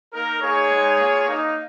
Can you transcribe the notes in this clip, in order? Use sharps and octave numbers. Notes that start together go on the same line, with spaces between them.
A#3 D#4 A#4
A#3 D#4 G#4 C#5
G#3 D#4
A#3 F4
A#3 D#4